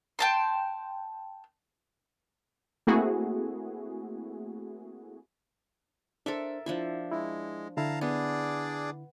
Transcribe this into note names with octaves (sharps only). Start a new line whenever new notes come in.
G5 A5 C6
A3 A#3 C4 E4 F#4 G#4
D4 A4 A#4 C5 E5
F3 D4 E4 E5
G#3 E4
D3 E4 F5 A5 A#5
B3 D4 G#4 D5